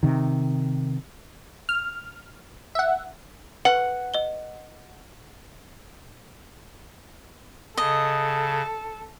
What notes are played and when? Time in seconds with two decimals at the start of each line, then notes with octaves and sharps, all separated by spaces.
0.03 C3 D#3
1.69 F6
2.75 E5 F#5
3.65 B4 F#5
4.14 D#5 G7
7.77 C#3 A4 D#5